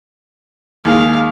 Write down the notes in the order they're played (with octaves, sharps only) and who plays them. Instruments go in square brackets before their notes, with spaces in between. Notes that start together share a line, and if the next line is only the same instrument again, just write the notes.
[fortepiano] D#2 D#3 G#3 [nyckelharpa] F5